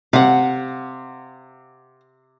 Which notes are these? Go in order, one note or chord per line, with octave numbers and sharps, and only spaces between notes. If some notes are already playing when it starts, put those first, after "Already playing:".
C3 F5 F#5